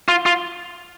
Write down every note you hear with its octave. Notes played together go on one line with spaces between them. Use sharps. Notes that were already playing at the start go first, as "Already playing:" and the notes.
F4
F4